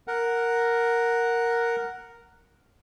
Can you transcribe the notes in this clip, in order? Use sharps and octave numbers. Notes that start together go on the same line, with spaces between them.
A#4 F#5